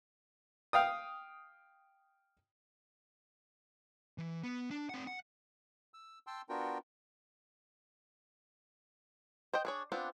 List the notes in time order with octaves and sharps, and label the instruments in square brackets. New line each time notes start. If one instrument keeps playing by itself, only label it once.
[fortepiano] F5 G5 D#6
[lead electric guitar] E3
B3
D4
C4 F#5
F#5
[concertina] E6
G5 A5 C6 E6
B3 D4 F4 F#4 A#4 G5
[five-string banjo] C5 D#5 G5
D4 G#4 C#5
B3 C4 D4 F4